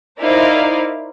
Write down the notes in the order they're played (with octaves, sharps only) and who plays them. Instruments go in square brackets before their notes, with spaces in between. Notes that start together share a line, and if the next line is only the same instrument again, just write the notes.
[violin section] D#4 E4 A#4 C5 D5 F5